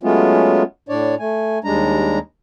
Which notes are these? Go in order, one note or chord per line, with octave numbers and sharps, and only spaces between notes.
F#3 G#3 A3 B3 C#4 F4
A2 D4 C#5 D5
A3 G#5
D#2 G3 G#3 D4 A#5